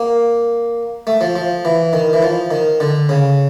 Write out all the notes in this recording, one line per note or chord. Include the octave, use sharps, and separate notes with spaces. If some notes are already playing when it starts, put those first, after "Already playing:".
Already playing: A#3
A3
F3
F3
E3
D#3
E3
F3
D#3
D3
C#3